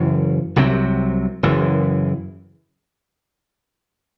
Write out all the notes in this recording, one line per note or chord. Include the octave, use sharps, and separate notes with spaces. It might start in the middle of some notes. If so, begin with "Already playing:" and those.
Already playing: F#1 F#2 E3
C2 C3 F#3 C4
F#1 F#2 E3